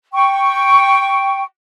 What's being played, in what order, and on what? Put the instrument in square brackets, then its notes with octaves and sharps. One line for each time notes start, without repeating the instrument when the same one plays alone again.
[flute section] G5 C#6